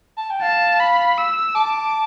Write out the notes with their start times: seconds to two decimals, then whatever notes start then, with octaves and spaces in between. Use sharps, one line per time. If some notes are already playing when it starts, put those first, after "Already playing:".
0.17 A5
0.30 G5
0.42 F5 A5
0.80 B5
1.18 E6
1.55 A5 D6